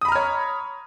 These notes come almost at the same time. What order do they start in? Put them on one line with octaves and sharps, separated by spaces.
D#6 B5 A#5 F6 C#5